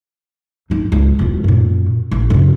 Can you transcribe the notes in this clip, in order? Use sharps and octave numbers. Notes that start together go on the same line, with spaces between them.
G1 D#4
C#2
E1 F4
F#2 A#2
A1
F#2 C#3